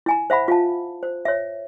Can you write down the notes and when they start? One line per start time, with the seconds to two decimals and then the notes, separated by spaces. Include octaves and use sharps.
0.06 E4 G#5 A#5
0.30 C5 E5 F#5 B5
0.48 F4 F5 A5
1.03 C5
1.25 C#5 E5